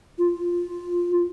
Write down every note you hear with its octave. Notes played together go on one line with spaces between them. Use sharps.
F4